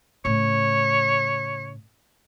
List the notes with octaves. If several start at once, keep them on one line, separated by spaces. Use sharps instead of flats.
A2 C#3 C#5